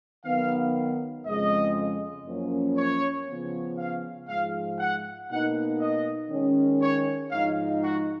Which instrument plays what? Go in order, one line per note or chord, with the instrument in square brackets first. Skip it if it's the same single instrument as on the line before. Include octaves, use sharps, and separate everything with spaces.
[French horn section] D#3 F#3 B3 [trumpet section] F5
[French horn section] F2 C#3 G#3 [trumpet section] D#5
[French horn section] F#2 F3 A#3 C#4
[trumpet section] C#5
[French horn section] C#3 F3 B3
[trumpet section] F5
[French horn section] G#2 F3 G#3 [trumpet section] F5
[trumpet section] F#5
[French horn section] B2 A#3 D#4 [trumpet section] F#5
[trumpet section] D#5
[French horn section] D#3 G#3 C#4
[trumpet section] C#5
[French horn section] G#2 F3 G#3 D#4 [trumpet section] F5
[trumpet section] F#4